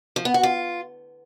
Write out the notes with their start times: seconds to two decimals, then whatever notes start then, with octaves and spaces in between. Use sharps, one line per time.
0.16 F3
0.25 B3
0.34 F#4
0.43 F4